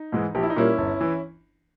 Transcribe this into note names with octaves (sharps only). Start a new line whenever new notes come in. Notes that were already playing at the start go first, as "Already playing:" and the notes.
Already playing: D#4
G#2 E3 G#3
A#1 G4
E4
D#4
A#2 G3 A#3 C#4 E4
G1
E3